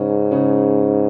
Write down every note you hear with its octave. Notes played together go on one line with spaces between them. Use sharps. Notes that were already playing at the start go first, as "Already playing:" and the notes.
Already playing: G#2 C#3 C#4
C#3 C#4